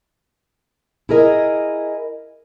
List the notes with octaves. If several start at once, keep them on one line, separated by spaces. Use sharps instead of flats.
E4 G#4 A#4 D#5